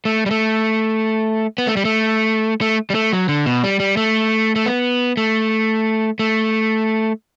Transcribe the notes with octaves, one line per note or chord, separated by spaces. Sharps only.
A3
G3
A3
B3
A3
G3
A3
A3
G3
A3
F#3
D3
B2
G3
G3
A3
A3
B3
A3
A3